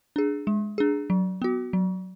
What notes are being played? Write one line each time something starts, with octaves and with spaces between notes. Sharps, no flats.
D4 G#4
G#3
D4 G#4
F#3
B3 F#4
F#3